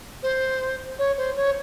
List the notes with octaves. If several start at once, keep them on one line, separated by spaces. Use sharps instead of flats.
C5
C#5
C5
C#5